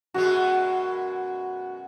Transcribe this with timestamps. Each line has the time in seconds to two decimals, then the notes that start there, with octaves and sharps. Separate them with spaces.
0.14 F#2 B2 G#3 F#4